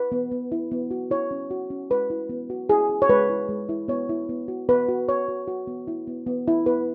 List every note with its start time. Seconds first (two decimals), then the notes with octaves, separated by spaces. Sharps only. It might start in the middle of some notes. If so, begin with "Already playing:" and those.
Already playing: B4
0.12 B3
0.32 B3
0.52 E4
0.72 B3
0.91 F#4
1.11 E4 C#5
1.31 C#4
1.51 F#4
1.70 C#4
1.90 G#3 B4
2.10 E4
2.29 B3
2.50 F#4
2.69 E4 G#4
2.89 C#4
3.02 C#5
3.09 G#3 B4
3.29 E4
3.49 G#3
3.69 E4
3.88 B3 C#5
4.09 E4
4.29 B3
4.48 F#4
4.69 B3 B4
4.89 F#4
5.08 B3 C#5
5.28 F#4
5.48 F#4
5.67 B3
5.88 E4
6.07 B3
6.27 B3
6.48 E4
6.66 B3 B4